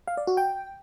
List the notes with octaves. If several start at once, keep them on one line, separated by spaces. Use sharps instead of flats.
F5
D5
F#4
G5